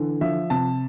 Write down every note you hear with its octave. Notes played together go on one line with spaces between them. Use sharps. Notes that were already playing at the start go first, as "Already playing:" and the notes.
Already playing: D3 E3
F3 E5
C3 A5